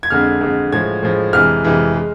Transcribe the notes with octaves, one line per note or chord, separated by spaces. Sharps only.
G#6
F2 D3 G#3 F6
F2 D3 G#3
A2 F3 G#3 G#6
A2 F3 G#3
F2 C3 E3 G#3 F6
F2 C3 E3 G#3
G#3